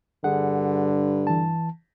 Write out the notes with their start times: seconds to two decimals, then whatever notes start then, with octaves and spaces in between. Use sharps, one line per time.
0.24 G2 D3 G#4 F#5
1.27 E3 A5